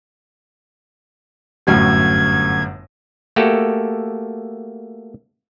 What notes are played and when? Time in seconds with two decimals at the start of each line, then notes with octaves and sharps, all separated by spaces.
1.67 G1 F#2 A2 G#6
3.36 A3 A#3 F#4 G4 A4